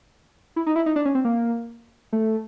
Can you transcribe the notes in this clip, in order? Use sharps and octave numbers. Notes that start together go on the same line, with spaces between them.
E4
D#4
E4
D#4
D4
C#4
C4
A#3
A3